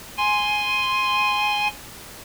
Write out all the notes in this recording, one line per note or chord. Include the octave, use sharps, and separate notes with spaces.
G#5 C6